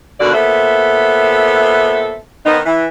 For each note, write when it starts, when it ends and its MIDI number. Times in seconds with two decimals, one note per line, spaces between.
0.20 0.32 39
0.20 0.32 47
0.20 0.32 50
0.20 0.32 58
0.20 0.32 66
0.20 0.32 74
0.33 2.16 46
0.33 2.16 59
0.33 2.16 69
0.33 2.16 72
0.33 2.16 76
2.44 2.59 51
2.44 2.59 59
2.44 2.59 60
2.44 2.59 63
2.65 2.85 52